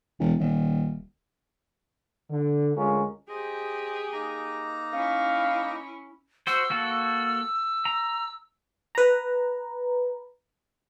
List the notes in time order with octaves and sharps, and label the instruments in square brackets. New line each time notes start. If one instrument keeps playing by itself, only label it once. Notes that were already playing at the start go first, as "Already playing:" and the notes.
[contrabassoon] E1
D#1
[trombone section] D3
D2 G#3 C#4 F4 A#4
[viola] G4 G#4 [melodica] C5 D#5
[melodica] A#3 D#4 A#5
[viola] C#4 E4 [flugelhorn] F5
[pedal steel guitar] F#4 C5 [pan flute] E6
[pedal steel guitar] A#3 F#4 A4
A#5
[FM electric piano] B4 A#5